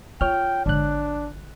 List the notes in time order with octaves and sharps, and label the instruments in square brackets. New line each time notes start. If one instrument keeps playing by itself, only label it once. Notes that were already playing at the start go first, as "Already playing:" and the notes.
[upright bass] F4 [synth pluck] C#5 F6 [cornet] G5
[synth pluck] G#1 F#6 [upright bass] D3 G#3 [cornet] D4